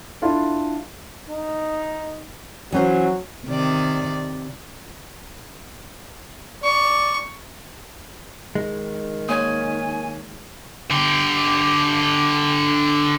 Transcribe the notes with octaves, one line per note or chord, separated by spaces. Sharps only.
D4 E4 F4 A4
D#4
E3 F#3 C#4 C5
C3 D#3 D5
D5 C#6
D#3 G#3
A#3 C#5 G#5 G#6
D3 G4